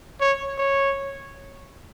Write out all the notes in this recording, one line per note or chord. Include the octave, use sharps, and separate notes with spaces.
C#5
C#5